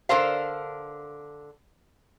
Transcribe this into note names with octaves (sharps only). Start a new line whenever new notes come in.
D3 A4 A#4 C5 F5